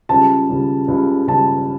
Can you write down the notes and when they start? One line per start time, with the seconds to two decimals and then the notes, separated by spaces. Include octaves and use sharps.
0.09 C#2 C#3 G3 A5
0.49 C#2 C#3 G3
0.88 C#2 C#3 G3
1.28 C#2 C#3 G3 A5